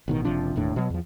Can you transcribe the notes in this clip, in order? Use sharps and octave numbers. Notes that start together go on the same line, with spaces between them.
A1 B2 D#3
F#1 C3 F3 D4
E1 D#2 A2 D4
B2 F#3
E2 F3